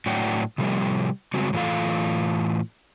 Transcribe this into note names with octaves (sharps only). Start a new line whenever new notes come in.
A2 F#3 D4 F#5 G5
C3 F3 G3 A3 C4 G4
C#3 G3 G#3 C4 F#4
A2 E3 F4 A4 F5